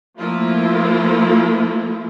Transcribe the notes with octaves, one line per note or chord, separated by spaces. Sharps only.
F3 A3 A#3 E4 F4